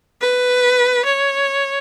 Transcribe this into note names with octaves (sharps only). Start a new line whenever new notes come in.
B4
C#5